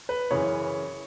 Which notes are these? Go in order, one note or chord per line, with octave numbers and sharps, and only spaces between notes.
B4
F#2 C#3 E3 C#5